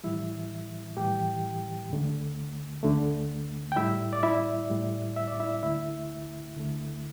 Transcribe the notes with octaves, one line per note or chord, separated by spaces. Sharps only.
A2 E3 G3 E4 E5
A2 E3 G3 G4 G5
D2 D3 A3
D2 D3 A3
G5
A2 G3 E4 E5
D5
E4 E5
A2 G3
E5
D5
E4 E5
D2 D3 A3 E4 E5
D2 D3 A3